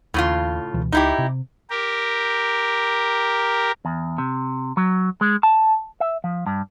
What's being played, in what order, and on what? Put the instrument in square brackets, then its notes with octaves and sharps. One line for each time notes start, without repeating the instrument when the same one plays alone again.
[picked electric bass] D#2 [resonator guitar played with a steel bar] A2 C#3 F4
[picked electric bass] C#2 B2 E3
[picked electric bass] C#2 [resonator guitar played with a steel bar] D#4 E4 G4
[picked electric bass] C3
[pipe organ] G4 A#4
[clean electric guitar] E2
C3
F#3
G#3
A5
E5
F3
G2